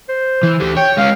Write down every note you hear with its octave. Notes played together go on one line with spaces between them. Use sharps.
C5
E3
D2 D3 G4
C#5 G5
G#3 C#4 F5